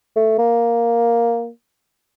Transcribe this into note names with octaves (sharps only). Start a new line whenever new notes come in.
A3
A#3